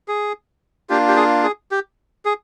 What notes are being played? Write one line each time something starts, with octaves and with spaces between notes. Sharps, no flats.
G#4
A#3 D4 F4 G4
G4
G#4
G#4
G4
G#4